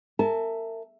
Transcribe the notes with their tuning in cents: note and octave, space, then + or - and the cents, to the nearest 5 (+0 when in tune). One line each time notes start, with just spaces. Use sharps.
A#4 -40 E5 +5 A5 -30